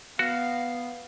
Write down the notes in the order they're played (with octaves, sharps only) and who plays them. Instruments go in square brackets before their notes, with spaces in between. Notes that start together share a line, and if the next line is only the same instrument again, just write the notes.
[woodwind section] B3 [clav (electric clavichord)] F#4 [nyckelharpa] F5